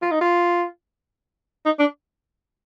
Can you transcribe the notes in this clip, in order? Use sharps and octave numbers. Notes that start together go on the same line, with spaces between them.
F4
D#4
F4
D#4
D4